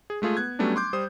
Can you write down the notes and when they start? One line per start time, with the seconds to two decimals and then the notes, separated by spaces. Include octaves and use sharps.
0.10 G#4
0.22 G#3 A3 F4 G#4
0.37 B3 F#6 G#6
0.59 F#3 G3 A3 B3 C#4 D4
0.76 C6 D6 G6
0.93 G3 C5 D#6